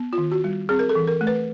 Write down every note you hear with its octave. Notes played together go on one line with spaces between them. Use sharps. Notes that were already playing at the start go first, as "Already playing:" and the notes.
Already playing: B3
F4
D#3
F#4
G3
C4 G#4
A#4
A4
E3
A#4
A3
B4